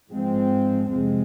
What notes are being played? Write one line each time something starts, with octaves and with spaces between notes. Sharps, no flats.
G#2 F3 G#3 C4
F2 C3 F3 G#3 C4